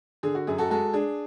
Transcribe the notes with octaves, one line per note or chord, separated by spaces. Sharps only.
D3 G#4
F#4
F#2 G#4
F#4 A4
G#3 F#4 A4
D4 G#4